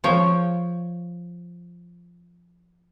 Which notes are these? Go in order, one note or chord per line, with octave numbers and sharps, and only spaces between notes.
F3 C#5 G5